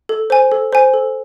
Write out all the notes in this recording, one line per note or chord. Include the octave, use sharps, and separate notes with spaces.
A4
C5 G#5
A4
C5 G#5
A4